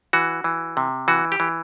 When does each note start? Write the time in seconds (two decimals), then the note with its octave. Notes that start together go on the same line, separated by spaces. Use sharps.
0.13 E3 F#4
0.44 E3
0.77 C3
1.08 E3 F#4
1.32 G4
1.40 E3